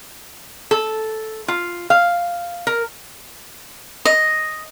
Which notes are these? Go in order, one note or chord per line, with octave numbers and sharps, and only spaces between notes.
A4
F4
F5
A#4
D#5